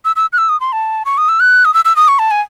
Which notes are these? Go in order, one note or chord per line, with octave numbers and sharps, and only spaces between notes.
E6
E6
F#6
E6
D#6
C6
A5
C#6
D#6
E6
F#6
D#6
E6
E6
D#6
C#6
A5
G#5